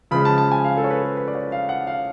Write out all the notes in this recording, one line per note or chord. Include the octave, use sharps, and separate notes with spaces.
C#3 F3 G#3 B5
A5
A5
G#5
F5
A4
C#5
B4
A4
B4
D5
C#5
F5
F#5
F5